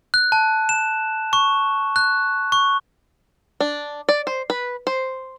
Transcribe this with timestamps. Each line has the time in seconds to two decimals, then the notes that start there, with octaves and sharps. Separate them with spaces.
0.14 F#6
0.32 A5
0.69 E7
1.33 C#6
1.96 F#6
2.52 C#6
3.61 D4
4.09 D5
4.27 C5
4.50 B4
4.87 C5